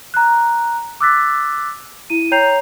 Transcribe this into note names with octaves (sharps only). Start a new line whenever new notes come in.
A#5 F#6
D6 E6 F#6 A6 B6
E4 D#7
C#5 G5 A#5 G6 C7 F7